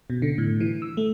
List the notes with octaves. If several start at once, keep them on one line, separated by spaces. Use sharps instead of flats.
B2
D3
A2
E3
E6
A3